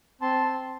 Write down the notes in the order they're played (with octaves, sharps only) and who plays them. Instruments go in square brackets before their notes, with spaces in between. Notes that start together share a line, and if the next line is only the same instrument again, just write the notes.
[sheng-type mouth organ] C4 A5 C6